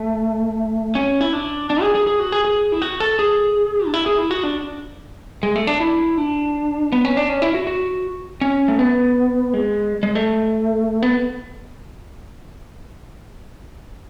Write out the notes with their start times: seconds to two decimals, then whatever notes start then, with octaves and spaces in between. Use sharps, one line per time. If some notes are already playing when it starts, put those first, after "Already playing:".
Already playing: A3
0.95 C#4
1.21 E4
1.33 D4
1.70 D4
1.82 G#4
1.95 G#4
2.07 G#4
2.20 F#4
2.32 G#4
2.45 G#4
2.72 E4
2.82 F#4
3.00 A4
3.19 G#4
3.86 D4
3.94 E4
4.06 G#4
4.18 E4
4.31 F#4
4.43 D4
5.43 G#3
5.56 A3
5.67 D4
5.80 E4
6.18 D4
6.92 B3
7.05 C#4
7.17 D4
7.29 C#4
7.42 E4
7.54 F#4
7.67 F#4
8.41 C#4
8.68 A3
8.79 B3
9.54 G#3
10.03 G#3
10.15 A3
11.03 B3